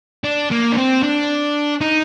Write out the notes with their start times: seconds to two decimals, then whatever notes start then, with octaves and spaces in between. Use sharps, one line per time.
0.24 D4
0.51 A#3
0.72 D4
0.77 C4
1.03 D4
1.81 D#4